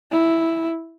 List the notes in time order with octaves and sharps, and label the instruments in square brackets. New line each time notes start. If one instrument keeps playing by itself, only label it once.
[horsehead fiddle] E4